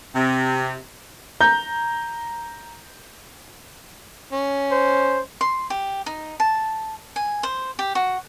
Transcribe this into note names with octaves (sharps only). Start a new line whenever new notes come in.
C3
A#5 G6
C#4
C5
C6
G4
D#4
A5
G#5
C5
G4
F#4